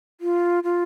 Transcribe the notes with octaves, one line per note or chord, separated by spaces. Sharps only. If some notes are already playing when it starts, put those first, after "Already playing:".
F4
F4